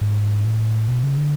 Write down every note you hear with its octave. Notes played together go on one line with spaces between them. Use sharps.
G#2
A2
B2
C#3
D3